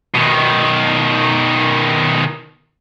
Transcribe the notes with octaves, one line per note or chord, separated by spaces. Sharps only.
B2 D#3